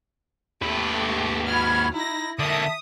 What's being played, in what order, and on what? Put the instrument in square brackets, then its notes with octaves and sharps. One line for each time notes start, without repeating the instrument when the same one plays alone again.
[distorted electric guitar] D#2 B4 [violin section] A3 G4
[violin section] F#4 F6 [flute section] B5 G#6
[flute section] D#4 [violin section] E4 A#6
[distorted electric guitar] D3 A#3 [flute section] E5 A5 [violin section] D#6